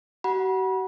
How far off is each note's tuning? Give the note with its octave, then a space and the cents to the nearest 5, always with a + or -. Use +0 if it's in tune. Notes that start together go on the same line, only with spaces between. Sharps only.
F#4 +45 F#5 +0 B5 -35